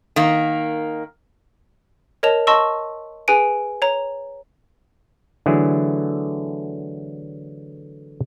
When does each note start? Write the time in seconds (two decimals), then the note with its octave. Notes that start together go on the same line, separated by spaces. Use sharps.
0.16 D#3 A#3
2.23 A#4 C#5 D#5 A5 F7
2.47 D#5 A5 C6 C#6 E6
3.28 G#4 B4 G#5 D7
3.82 C#5 A#5
5.46 D3 E3 F#3 A3 E4 G#4